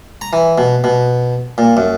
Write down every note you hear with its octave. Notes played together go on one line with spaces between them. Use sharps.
A#5
E3
B2
B2
A#2
F#2